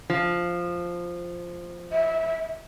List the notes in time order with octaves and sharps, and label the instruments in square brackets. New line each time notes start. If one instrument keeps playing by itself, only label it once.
[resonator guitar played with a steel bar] F3
[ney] E5